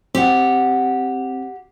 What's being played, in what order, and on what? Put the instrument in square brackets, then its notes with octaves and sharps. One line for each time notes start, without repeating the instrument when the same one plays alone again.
[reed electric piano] C4 [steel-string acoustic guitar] G4 F#5